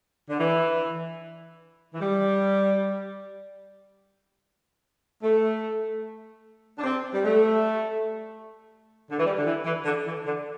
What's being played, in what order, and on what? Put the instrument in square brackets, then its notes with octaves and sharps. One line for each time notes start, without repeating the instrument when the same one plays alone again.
[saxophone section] D3
E3
E3
G3
A3
D4
C4
G3
A3
D3
E3
G3
D3
E3
E3
D3
E3
D3